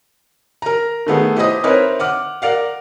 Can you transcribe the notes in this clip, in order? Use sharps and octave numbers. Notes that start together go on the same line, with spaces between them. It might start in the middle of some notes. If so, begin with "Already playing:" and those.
A#4 A#5
D#3 A3 B3 G#4
E4 G4 C5 D#5 D#6
C4 D#4 A#4 B4 C#5 E5
F#5 D6 F6
A#4 D5 F5 F#5